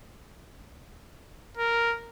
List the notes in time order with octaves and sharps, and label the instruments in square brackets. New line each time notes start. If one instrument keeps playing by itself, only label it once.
[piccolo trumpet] A#4